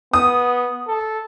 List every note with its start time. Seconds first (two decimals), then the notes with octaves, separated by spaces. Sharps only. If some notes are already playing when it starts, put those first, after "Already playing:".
0.13 B3 D#6
0.87 A4